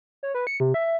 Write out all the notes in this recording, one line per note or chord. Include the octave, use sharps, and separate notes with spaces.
C#5
B4
C#7
C3
E5